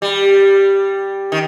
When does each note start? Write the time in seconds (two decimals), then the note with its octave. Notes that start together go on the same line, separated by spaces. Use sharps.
0.02 G3
1.32 D#3